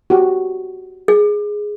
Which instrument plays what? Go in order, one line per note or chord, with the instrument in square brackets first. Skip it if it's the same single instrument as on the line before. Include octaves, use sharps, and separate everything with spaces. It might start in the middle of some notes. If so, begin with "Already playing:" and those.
[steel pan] F#4 G4
[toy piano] G#4